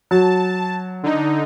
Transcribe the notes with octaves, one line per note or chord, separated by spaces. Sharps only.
F#3 A5
D3 D#4